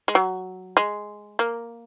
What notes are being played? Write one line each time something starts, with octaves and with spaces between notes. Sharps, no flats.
G#3
F#3
G#3
A#3